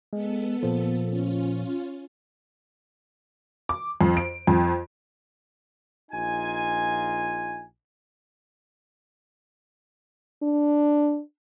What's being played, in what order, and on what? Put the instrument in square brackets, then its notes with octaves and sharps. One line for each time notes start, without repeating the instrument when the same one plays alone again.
[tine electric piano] G#3 [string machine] B3 A4
[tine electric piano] A#2 F3
[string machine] C#4 F4
[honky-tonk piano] D6
F2
D7
F2
[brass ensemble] A#1 D#4 F4 G#5
[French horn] D4